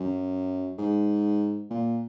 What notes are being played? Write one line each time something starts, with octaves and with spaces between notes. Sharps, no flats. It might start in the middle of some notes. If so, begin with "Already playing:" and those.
Already playing: F#2
G#2
A#2